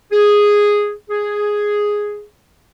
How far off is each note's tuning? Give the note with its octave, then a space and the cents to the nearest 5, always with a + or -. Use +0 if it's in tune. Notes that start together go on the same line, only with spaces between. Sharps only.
G#4 -5
G#4 +0